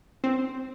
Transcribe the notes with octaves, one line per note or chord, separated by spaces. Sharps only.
C4